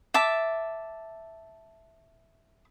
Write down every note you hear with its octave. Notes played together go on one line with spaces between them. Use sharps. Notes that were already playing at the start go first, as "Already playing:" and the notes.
E5 A5 D6